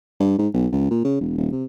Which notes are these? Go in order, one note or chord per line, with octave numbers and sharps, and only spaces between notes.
G2
G#2
B1
C#2
A#2
C#3
E1
D#1
C3